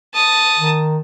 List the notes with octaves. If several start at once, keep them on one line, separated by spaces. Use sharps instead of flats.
A5 D#6
D#3